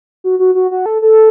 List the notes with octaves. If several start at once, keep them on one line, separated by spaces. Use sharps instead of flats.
F#4
F#4
F#4
F#4
A4
A4